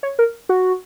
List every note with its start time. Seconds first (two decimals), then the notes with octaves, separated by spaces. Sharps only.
0.03 C#5
0.19 A#4
0.49 F#4